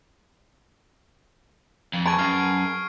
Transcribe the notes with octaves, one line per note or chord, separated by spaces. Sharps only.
F2
G#4 B4 A5 C#6 G#6 D7
F#2 F6 G#6 C7